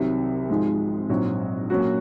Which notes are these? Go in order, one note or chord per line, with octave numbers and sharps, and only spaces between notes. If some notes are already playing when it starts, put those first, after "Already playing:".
Already playing: C2 C3 D#3 F#3
G#1 G#2 F3 G#3 D#4
A#1 G#2 F#3 C4 F#4
A#2 F#3 C#4 F#4